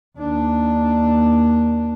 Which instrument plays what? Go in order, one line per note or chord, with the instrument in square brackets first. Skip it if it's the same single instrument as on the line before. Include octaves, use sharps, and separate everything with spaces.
[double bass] D#2 D4